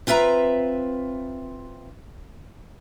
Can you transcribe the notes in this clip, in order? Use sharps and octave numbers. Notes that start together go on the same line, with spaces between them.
C4 F4 B4 E5 A#5